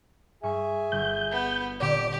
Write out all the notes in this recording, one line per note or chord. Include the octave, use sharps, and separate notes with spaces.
G2 G#4 E5 G#5 C#6
G1 G6
B3
A#2 D3 C4 G4 D5